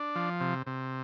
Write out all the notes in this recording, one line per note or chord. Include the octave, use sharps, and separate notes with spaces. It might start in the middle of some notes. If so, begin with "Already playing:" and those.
Already playing: D4
F3
C3
C3